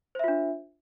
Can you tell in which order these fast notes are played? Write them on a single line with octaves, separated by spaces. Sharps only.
C5 E5 F4 D4